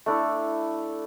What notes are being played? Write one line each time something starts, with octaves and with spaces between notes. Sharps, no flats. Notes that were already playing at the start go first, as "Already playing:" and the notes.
A3 D4 E4 A4